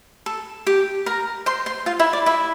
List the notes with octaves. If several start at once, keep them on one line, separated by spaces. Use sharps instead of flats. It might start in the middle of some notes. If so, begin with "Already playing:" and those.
A4
G4 G5
A#4 A#5
C5 C6
C5 C6
F4 F5
E4 E5
D5
E4 E5